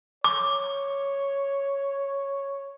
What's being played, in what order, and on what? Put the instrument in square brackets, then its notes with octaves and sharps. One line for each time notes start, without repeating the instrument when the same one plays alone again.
[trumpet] C#5 [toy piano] D6